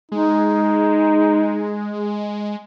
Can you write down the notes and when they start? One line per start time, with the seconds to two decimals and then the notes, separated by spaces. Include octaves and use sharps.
0.12 G#3 D#4